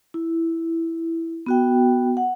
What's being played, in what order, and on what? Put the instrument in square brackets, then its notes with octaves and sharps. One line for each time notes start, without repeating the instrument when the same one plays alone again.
[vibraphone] E4
B3 F#4 G5
F#5